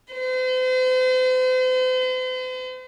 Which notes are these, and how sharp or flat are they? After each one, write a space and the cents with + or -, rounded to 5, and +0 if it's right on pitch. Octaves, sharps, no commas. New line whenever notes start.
C5 -40